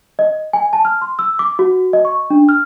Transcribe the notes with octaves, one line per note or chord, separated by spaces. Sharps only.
D#5
G#5
A5
F6
C6
E6
D6
F#4
D#5
C#6
D4
F6